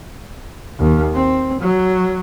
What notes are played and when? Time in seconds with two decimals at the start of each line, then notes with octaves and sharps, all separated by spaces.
0.79 D#2
1.15 C4
1.61 F#3